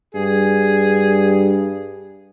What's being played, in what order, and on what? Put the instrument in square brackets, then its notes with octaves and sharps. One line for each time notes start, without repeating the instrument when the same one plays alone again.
[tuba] G2 [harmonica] G#4